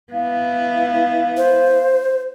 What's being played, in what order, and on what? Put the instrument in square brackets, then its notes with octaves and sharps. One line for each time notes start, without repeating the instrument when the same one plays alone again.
[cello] B3 E4 [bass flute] F5
[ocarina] C5